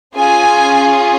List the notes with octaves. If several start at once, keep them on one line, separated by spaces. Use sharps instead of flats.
C#4 F4 G#4 G#5